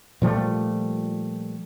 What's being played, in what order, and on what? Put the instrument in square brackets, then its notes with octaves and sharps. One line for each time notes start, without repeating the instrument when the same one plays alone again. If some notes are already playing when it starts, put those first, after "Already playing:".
[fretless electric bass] A#2 F3 G3 A3